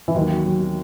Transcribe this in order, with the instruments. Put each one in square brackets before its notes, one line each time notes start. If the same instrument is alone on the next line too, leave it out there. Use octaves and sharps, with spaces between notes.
[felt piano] E3
[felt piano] D#2 D#3 [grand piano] F#3
[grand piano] F#4
F#3
F#3